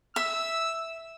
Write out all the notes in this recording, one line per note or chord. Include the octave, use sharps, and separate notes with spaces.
E5 E6